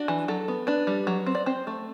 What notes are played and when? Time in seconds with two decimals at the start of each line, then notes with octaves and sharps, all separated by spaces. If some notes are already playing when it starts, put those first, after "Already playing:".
Already playing: D4 F#4
0.08 E3
0.28 F#3 A4
0.48 B3
0.67 D4 B4
0.87 G3
1.07 F#3
1.26 C4
1.35 D5
1.46 C4 C5
1.67 A3